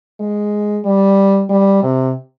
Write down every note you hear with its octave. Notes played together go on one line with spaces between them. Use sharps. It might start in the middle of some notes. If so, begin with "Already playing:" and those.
G#3
G3
G3
C3